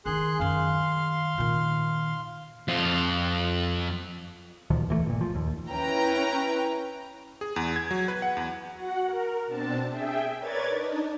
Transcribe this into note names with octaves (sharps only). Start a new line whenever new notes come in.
D#3 D#4 G#4 C6 F#6
F#2 D#3 F5 C6
A#2 D#3
F2 F4
D2 A#2 D#3 F3
D#1 E3 F3 A3
G1 A#2
F3
D#2
C#4 E4 B4 G5 A#5
G#4
E2
G#6
F#3
B4
F#5
E2
F#4 F#5
A#4
B2 C4 D4 A5
G#4 E5 G5
A#4 B4 C#5 D5 G#6 A6
D4 D#4